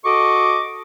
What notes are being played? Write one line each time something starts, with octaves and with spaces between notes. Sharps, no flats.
F#4 A4 D#5 C#6 D6